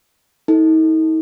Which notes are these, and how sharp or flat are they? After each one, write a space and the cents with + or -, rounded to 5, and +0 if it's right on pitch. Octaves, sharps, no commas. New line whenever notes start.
D#4 +40 A4 +5